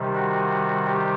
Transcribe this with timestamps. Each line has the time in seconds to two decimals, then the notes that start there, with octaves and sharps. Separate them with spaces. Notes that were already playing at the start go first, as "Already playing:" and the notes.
Already playing: C3 D#3 G3
0.15 F#4
0.86 G4